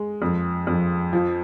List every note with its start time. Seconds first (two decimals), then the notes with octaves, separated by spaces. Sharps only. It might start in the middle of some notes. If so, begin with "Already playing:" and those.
Already playing: G#3
0.22 F2
0.67 F2
1.13 F3